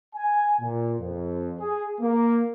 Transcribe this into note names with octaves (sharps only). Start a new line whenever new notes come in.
G#5
A#2
F2
G#4
A#3